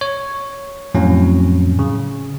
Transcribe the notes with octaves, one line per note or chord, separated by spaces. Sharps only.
C#5
F2 A2 F#3 C#4
C#3